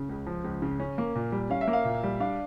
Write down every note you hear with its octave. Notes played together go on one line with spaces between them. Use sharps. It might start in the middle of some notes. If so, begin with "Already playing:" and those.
Already playing: C#3
C#2
F3
C#2
C#3
C#4
A#3
A#2
G3
C#4 F5
E5
A#3
F5
A#2
G3
D4 F5